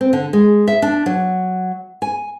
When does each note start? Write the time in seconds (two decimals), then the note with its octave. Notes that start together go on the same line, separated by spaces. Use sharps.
0.01 C4
0.13 D3
0.33 G#3
0.68 E5
0.82 D4
1.06 F#3
2.02 G#5